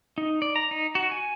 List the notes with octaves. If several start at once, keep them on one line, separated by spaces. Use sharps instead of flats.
D#4
D5
A#5
D#4
F#4
G#5